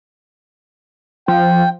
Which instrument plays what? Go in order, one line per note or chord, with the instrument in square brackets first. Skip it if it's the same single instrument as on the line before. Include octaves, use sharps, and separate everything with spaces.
[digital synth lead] F3 [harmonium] G5